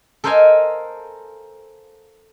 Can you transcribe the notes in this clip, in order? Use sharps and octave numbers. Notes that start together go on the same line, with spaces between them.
A4 A#4 C5 D#5 F5 G#5